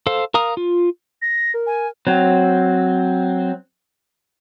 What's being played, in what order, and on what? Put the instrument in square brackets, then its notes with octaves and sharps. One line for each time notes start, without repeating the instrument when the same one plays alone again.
[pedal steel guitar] A4 C5 F5
A#4 F5 A#5 D#6
F4
[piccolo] A#6
[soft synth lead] A#4
[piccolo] G#5
[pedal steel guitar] F#3 C4